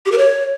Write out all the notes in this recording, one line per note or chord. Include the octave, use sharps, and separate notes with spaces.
G4
A#4
C#5